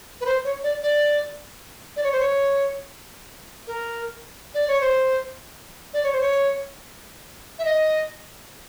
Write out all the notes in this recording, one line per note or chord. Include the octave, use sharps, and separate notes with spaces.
B4
C5
C#5
D5
D5
D5
C#5
C5
C#5
A#4
D5
C#5
C5
D5
C#5
C5
C#5
E5
D#5